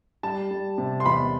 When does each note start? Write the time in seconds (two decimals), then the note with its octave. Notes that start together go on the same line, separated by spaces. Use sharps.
0.23 G3 A5
0.51 G3
0.78 C3
1.00 C6
1.05 E2 B5